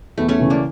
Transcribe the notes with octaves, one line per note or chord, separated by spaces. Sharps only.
E2 A3
A3 C#4
C#3 E3
A#3 D4